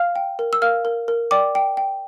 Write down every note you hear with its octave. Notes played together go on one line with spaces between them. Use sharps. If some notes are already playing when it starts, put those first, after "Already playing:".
Already playing: F5 F6
G5
A#4
E6
A#4 F5 F6
A#4
A#4
D5 G5 D6
G5
G5